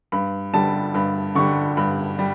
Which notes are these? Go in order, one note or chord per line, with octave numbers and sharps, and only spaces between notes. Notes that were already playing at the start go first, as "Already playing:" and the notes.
G2 B5
D3 G3 A5
G2 B5
D3 G3 C#6
G2 B5
G3